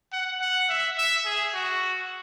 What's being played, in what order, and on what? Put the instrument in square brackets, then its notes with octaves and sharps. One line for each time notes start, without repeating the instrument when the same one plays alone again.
[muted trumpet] F#5
F#5
E5
E5
G#4
F#4